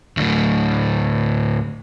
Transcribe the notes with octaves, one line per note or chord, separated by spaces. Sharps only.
D2 A2